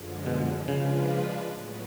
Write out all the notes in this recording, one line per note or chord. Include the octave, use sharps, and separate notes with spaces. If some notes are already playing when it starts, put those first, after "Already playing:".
Already playing: F#2 D3 F3 G#3
B2
C#3 F3 G#3 D4 F4 B4
A2 F#3 B3